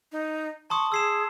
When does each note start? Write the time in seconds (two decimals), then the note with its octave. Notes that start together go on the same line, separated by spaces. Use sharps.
0.12 D#4
0.70 A5 C6 C#6 D#6
0.92 G#4 E6 C7 E7